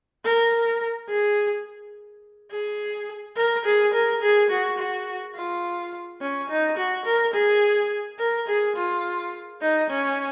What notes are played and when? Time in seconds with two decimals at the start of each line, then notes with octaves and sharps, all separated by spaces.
0.25 A#4
1.10 G#4
2.52 G#4
3.36 A#4
3.65 G#4
3.94 A#4
4.22 G#4
4.50 F#4
4.78 F#4
5.35 F4
6.21 C#4
6.50 D#4
6.77 F#4
7.05 A#4
7.34 G#4
8.19 A#4
8.48 G#4
8.76 F4
9.61 D#4
9.90 C#4